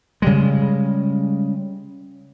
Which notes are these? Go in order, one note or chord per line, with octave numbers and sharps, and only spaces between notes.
C#3 G3 G#3